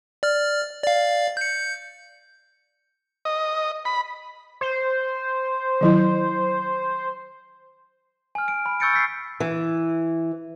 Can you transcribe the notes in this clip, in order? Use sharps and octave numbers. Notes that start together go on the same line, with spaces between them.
D5 F6
D5 F5
G6 C#7
D#5
B5
C5
D#3 F#3 E4
G#5 F6
D7
B5
C#6 E6 G6 A6 C#7 D7
E6 G6 B6 C7
E3